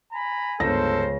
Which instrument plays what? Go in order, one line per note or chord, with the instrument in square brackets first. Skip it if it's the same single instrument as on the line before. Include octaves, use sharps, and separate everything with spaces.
[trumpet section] G#5 A#5 B5
[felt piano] G1 A#6 [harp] C#2 [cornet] A4 [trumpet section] A#4 C5